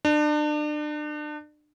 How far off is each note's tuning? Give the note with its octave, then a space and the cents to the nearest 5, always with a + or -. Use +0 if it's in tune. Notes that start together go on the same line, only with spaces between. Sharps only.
D4 +35